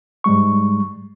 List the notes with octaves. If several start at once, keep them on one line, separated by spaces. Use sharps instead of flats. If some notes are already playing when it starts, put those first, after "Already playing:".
G#2 G3 G#3 C#6